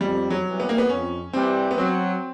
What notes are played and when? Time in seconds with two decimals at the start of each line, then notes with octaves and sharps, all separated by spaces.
0.01 F2 G3
0.30 F#3
0.45 C3 E3 G3
0.60 B3
0.69 A#3
0.78 B3
0.89 F2 C#4
1.33 C3 E3 G3 C4
1.71 B3
1.78 F#3 C4